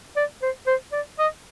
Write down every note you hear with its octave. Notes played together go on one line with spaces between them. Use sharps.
D5
C5
C5
D5
D#5